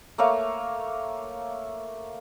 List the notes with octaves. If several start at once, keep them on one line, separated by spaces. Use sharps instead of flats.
A3 A#3 C#5 F5